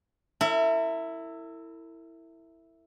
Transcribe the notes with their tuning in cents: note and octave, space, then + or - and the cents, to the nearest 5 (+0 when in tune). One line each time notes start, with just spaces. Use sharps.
E4 +0 A#4 -45